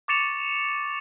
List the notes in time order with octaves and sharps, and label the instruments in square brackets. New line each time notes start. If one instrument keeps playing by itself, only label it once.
[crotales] C#6 D6 A6 C#7 E7 F7